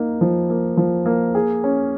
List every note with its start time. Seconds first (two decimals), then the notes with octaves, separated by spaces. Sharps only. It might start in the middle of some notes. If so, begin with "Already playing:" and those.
Already playing: A#3 D#4
0.21 F3
0.50 A#3
0.77 F3
1.06 A#3
1.35 G#4
1.64 C#4